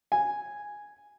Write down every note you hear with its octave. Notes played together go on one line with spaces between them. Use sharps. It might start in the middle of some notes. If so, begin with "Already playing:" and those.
G#5